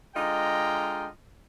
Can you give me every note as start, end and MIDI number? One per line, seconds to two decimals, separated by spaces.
0.15 1.07 50
0.15 1.07 56
0.15 1.07 65
0.15 1.07 75
0.15 1.07 79
0.15 1.07 82